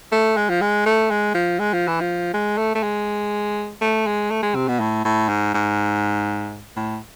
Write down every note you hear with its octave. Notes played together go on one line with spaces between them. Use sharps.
A3
G#3
F3
G#3
A3
G#3
F3
G#3
F3
E3
F3
G#3
A3
A3
G#3
A3
G#3
A3
G#3
C3
B2
A2
A2
G#2
G#2
A2